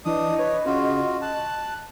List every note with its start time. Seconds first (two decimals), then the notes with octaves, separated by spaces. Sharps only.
0.05 E3 D4 D#5 D#6
0.39 B4 C#5
0.66 C#3 F4 F#4
1.22 A5 F#6